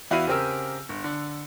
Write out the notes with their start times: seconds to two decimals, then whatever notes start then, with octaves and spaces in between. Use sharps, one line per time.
0.11 E2 E4 F#4 F5 B5 D#7
0.27 C#3 C4 G4 A#4 E6
0.89 G1
1.04 D3